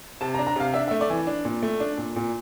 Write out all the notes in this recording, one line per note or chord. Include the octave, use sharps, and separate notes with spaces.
C3 A5
A#5
D4
A#5
C3 F5
D4 E5
E5
A3
D5
E3
D4
A#2
A3
D4
A#2
A#2